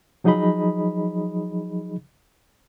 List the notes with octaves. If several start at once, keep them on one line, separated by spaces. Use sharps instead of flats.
F3 F#3 D#4 G#4 D#5 B5